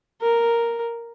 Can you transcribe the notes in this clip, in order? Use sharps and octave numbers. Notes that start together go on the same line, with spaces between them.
A#4